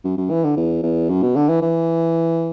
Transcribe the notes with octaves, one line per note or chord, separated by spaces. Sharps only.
F#2
F#2
E3
D3
E2
E2
F#2
B2
D3
E3
E3